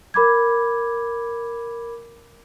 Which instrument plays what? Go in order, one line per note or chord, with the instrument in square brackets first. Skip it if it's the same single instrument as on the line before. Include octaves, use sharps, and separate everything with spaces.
[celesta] A#4 B5 D6 G#6